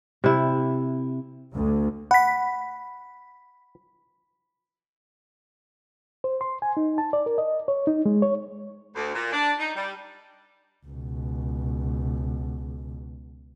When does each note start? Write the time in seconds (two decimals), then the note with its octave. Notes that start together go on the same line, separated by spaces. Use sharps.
0.24 C3 E4
1.54 D2
2.11 F#5 B5 B6
6.24 C5
6.41 C6
6.62 G#5
6.77 D#4
6.98 A5
7.13 D5
7.26 A#4
7.38 D#5
7.68 C#5
7.87 D#4
8.06 G#3
8.22 C#5
8.96 D2
9.14 A#2
9.32 D4
9.59 D#4
9.75 G3
10.86 C#2 B2